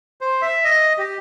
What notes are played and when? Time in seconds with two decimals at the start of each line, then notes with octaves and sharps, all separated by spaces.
0.21 C5
0.42 E5
0.64 D#5
0.98 G4